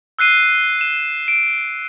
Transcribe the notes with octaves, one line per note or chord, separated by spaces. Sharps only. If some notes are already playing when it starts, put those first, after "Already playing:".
E6 F#6 C7 D#7
E7
D7